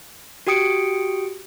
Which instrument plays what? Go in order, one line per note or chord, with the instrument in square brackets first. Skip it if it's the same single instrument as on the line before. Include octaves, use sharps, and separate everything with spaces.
[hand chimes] F#4 G4 G5 D#6 C#7 D7